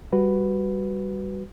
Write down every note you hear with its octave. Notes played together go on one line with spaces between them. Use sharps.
G3 F#4 B4